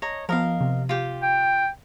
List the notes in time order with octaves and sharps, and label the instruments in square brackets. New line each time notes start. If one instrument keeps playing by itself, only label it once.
[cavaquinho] C#5 D#5 A#5
[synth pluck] F3 B3 [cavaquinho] A#4 D#5 F5
[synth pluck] C3
[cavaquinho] F4 G4
[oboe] G5